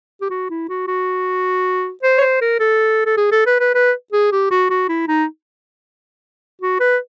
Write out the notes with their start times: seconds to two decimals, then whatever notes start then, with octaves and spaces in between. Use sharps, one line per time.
0.21 G4
0.30 F#4
0.50 E4
0.69 F#4
0.88 F#4
2.03 C5
2.18 C#5
2.21 C5
2.41 A#4
2.60 A4
3.06 A4
3.17 G#4
3.32 A4
3.46 B4
3.60 B4
3.75 B4
4.13 G#4
4.32 G4
4.51 F#4
4.70 F#4
4.89 E4
5.08 D#4
6.62 F#4
6.80 B4